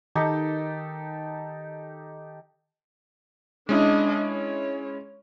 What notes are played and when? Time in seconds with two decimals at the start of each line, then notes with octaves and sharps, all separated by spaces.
0.16 D#3 D#4 G4 A4
3.69 G#3 C#4 D4 E4 D#5
4.31 C#5